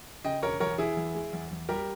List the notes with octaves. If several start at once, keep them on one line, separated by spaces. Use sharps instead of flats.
C#3 D#5 G5
E1 A#4 C#5
E2 A#4 C#5
E3 E4 G#4
E2
G#3
E2
E2
G3 G4 A#4